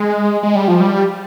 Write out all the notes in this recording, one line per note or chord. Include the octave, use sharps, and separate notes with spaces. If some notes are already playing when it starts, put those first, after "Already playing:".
Already playing: G#3
G#3
G3
F3
G3